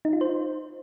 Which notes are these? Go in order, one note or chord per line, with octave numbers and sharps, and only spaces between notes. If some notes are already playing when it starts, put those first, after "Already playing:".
D#4
F4
C5